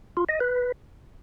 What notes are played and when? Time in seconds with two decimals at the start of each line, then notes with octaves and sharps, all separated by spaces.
0.17 F4
0.29 D#5
0.40 B4